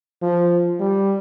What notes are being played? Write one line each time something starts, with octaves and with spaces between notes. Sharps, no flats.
F3
G3